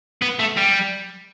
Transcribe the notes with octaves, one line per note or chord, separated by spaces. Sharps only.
B3
A3
G3